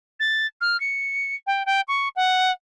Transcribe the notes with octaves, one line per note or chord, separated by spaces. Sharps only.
A6
F6
C#7
G5
G5
C#6
F#5